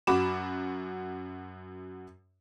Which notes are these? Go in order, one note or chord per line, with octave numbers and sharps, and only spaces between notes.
F#2 F#4 B5 D6 E7